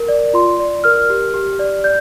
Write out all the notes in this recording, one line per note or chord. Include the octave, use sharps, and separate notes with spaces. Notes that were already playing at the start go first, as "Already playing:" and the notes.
Already playing: A#4
D5
F4 C6
D5
A#4 F6
G4
G4
D5
D5 G6